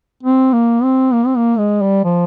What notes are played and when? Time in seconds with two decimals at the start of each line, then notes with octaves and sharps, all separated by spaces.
0.23 C4
0.53 A#3
0.83 C4
1.13 A#3
1.27 C4
1.37 A#3
1.58 G#3
1.82 G3
2.04 F3